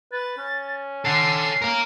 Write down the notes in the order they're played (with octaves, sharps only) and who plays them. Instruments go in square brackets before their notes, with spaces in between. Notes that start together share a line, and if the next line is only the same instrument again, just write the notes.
[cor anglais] B4 [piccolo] A6
[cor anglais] C#4
[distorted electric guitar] A4 F#5 [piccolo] C7
[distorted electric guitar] A#4 F5